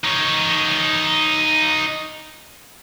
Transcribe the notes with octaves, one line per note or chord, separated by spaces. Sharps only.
D#4 C#5